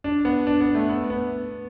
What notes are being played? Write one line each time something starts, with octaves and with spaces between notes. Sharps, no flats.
D4
B3
D4
B3
A3
B3
B3